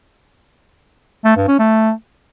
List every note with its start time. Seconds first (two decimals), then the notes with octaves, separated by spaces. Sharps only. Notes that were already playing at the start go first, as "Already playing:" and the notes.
1.25 A3
1.36 G2
1.48 C#4
1.59 A3